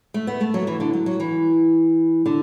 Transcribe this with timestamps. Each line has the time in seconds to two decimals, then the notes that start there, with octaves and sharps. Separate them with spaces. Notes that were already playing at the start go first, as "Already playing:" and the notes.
0.14 A3
0.27 B3
0.41 A3
0.54 F#3
0.67 E3
0.80 D3
0.93 F#3
1.06 F#3
1.20 E3
2.26 D3